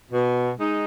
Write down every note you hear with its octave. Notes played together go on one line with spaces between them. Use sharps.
B2
G#3 D#4